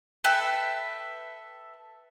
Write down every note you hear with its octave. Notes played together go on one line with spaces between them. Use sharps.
A4 B4 E5 G5